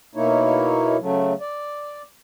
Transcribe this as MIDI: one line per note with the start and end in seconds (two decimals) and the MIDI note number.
0.15 0.97 47
0.15 0.97 58
0.15 0.97 63
0.15 0.97 64
0.15 0.97 73
1.00 1.33 49
1.00 1.33 54
1.00 1.33 57
1.41 2.02 74